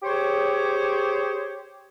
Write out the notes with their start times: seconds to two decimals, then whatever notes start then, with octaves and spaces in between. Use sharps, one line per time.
0.03 G4 G#4 C5 C#5